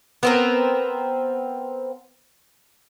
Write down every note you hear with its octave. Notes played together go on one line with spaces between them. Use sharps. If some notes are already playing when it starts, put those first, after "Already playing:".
B3 C4 A#4